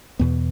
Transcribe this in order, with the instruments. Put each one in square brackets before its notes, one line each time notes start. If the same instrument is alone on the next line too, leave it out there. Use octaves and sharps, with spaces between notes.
[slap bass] E2 B2 B3